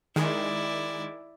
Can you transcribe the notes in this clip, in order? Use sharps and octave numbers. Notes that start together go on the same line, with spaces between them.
D#3 G#3 E4 D5